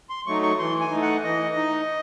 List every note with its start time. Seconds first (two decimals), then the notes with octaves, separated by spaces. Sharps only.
0.10 C6
0.26 F#3 A3 D#4 C#6
0.42 C#6
0.58 E3 C6
0.81 G#5
0.91 A3 D#4
1.02 F#5
1.24 E3 D#5
1.55 D#4